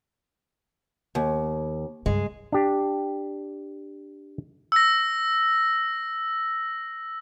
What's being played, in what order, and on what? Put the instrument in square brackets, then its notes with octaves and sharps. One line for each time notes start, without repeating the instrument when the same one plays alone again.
[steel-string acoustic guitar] D#2
[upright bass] C#2 G2 [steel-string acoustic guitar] G#3
[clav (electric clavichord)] D4 G4
[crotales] E6 A#6